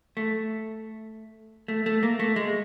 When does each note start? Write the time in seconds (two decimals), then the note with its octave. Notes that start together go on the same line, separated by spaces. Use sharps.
0.17 A3
1.68 A3
1.86 A3
2.03 A#3
2.20 A3
2.36 G#3